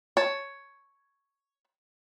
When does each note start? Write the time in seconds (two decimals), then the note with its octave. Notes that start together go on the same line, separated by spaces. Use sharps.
0.17 C#5 A5